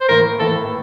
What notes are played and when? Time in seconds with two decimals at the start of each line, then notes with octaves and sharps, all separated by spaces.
0.01 C5
0.08 A2 E3 A#3 A#4
0.39 A2 E3 A#3 A4